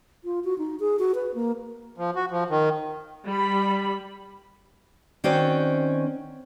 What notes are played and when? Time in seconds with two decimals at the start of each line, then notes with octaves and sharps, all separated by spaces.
0.25 F4
0.44 F#4
0.58 D#4
0.80 G#4
0.99 F#4
1.15 B4
1.35 A#3
1.98 F3
2.15 F#4
2.31 F3
2.50 D#3
3.26 G3 B5
5.24 D#3 C4 C#4 F#4 C5 D5